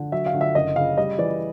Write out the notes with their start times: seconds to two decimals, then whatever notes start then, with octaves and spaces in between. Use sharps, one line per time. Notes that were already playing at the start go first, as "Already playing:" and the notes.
Already playing: D3
0.12 F#3 E5
0.26 F5
0.34 D3
0.41 E5
0.55 F#1 D#5
0.76 C#3 F5
0.97 G3 D#5
1.18 E3 D5